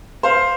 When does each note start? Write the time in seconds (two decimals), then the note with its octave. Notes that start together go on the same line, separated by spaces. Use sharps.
0.23 C5 F5